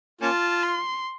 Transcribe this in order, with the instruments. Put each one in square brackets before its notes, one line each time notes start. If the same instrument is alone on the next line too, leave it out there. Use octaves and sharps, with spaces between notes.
[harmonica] A#3 C#4 F4 [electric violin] A5
[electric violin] C6